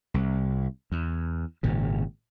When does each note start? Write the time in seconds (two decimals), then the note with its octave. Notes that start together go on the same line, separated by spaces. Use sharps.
0.14 C2
0.92 E2
1.63 G#1 A#2 C#3